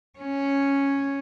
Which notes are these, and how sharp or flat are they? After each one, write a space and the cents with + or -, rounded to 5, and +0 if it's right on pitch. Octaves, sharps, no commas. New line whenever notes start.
C#4 +0